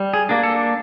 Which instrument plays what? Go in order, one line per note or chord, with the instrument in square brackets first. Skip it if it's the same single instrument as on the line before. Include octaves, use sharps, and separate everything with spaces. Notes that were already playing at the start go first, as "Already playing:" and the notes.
Already playing: [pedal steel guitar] G3
G#4
A#3 D4
A4